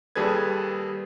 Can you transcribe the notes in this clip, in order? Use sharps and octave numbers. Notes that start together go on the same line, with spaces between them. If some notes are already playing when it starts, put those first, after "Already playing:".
D#2 G3 G#4 A4 B4 G#6